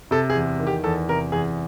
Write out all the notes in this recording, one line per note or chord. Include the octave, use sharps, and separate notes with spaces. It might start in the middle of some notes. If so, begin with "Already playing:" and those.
C3 A4
G#4
E2
D#3
G4
E2 A4
C3 A#4
E2 G#4